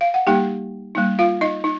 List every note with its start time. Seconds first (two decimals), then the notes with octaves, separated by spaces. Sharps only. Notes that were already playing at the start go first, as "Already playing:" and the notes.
0.01 F5
0.14 F#5
0.27 G3 A#3 D#4 G4 G5
0.95 G3 A#3 D#4
1.19 F4 F5
1.41 D#4 D#5
1.64 D#4